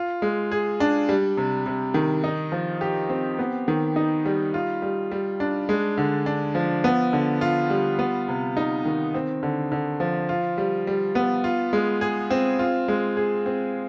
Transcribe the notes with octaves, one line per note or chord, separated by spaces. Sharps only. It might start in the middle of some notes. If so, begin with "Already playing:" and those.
Already playing: F4
G#3
G#4
D4
G3
C3
C3
D#3
D#4
F3
G4
C4
B3
D#3
D#4
G3
F4
G3
G3
D4
G#3
D3
D4
F3
B3
D3
F4
G3
B3
C3
D#4
D#3
C4
D3
D3
F3
F4
G3
G3
B3
F4
G#3
G#4
C4
F4
G#3
G#4
C4